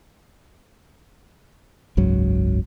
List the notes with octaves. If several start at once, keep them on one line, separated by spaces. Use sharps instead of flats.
F#1 C#2 G#2 F#3